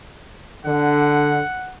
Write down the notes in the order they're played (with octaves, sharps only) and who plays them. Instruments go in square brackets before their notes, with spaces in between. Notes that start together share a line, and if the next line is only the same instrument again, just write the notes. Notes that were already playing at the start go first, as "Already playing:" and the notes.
[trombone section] D3 [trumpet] F#5